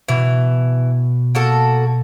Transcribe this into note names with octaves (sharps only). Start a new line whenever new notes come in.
B2 E3
A#3 F#4 A4